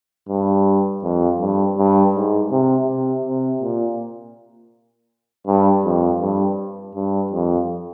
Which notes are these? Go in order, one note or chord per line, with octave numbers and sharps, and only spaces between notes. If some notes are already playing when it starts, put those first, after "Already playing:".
G2
F2
G2
G2
G#2
C3
C3
C3
A#2
G2
F2
G2
G2
F2